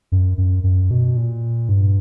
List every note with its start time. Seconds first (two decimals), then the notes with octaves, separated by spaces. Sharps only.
0.12 F#2
0.38 F#2
0.63 F#2
0.91 B2
1.17 A#2
1.69 G2